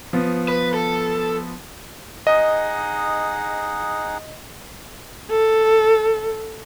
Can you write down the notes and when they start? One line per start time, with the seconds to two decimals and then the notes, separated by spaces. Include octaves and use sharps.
0.13 F3 B3
0.48 B4
0.74 A4
2.27 D#4 G#4 D#5 F#5
5.30 A4